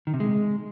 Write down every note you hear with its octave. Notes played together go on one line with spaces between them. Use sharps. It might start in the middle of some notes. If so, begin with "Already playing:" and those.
D#3
C3
G#3